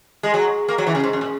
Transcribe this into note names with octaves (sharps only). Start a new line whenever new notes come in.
G#3
F#3
A#3
F#3
E3
C#3
G#2
F#2
A#2